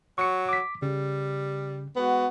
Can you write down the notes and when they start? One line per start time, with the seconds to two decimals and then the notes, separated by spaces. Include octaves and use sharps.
0.18 F#3 C#6 C#7
0.49 D6 B6
0.82 C#3 G3
1.96 G#3 B3 F#4